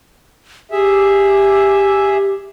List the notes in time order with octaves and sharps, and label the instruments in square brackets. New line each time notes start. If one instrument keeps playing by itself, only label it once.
[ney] G4 [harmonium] G#4 E5